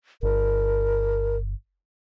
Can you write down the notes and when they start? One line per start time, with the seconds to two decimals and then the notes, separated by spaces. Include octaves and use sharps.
0.23 G1 A#4